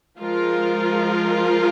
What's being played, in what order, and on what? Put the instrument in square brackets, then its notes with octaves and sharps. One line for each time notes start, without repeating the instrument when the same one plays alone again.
[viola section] F3 G#3 F4 A#4